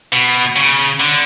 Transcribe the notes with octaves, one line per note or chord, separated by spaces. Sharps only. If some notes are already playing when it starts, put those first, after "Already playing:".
B2
C#3
D3